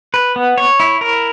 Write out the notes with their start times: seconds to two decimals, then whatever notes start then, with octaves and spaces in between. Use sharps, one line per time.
0.14 B4
0.36 B3
0.58 C#5
0.80 E4
1.01 A#4